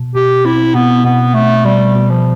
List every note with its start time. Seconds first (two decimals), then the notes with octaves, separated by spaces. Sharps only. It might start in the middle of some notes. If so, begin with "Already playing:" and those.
Already playing: B2
0.15 B2 G4
0.45 C4 E4
0.75 B2 B3
1.05 B2 B3
1.34 B2 A3
1.64 B2 G3
1.95 B2
2.10 F3